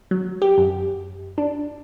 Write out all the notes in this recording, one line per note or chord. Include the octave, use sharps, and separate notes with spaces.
F#3
G4
F#2
D4